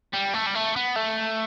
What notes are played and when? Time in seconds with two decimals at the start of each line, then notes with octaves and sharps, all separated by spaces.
0.14 G3
0.34 A3
0.47 G3
0.55 A3
0.76 B3
0.96 A3